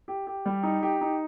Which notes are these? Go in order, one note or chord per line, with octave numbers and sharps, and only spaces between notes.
G4
G4
G3
D#4
G4
D#4